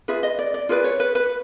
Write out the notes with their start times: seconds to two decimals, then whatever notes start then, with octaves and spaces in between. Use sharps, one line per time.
0.08 F4 G#4 B4 E5
0.23 D#5
0.39 D5
0.54 D5
0.69 F4 G#4 B4 D5
0.84 C#5
1.00 B4
1.15 B4